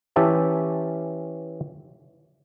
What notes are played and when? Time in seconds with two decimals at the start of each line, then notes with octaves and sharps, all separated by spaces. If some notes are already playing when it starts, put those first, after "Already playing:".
0.16 E3 C#4 G4 E5 A5